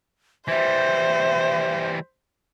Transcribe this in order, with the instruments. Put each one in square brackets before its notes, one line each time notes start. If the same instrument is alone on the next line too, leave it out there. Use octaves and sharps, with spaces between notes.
[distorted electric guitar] E3 G3 [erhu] C5 [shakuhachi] E5